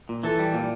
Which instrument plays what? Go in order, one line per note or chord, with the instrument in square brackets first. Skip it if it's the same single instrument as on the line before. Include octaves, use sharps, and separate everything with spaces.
[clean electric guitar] A#2
[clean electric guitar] E3 [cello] A4
[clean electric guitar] G3
A#2